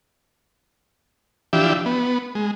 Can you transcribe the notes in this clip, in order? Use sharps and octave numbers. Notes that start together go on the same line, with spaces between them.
E3 F3 D4 G4 E5
B3
G#3